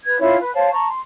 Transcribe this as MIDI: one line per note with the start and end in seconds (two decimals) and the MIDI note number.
0.05 0.19 71
0.05 0.19 92
0.19 0.36 61
0.19 0.36 64
0.19 0.36 65
0.19 0.36 73
0.40 0.53 71
0.54 0.71 72
0.54 0.71 73
0.54 0.71 77
0.54 0.71 81
0.72 0.88 81
0.72 0.88 82
0.72 0.88 85
0.89 0.99 84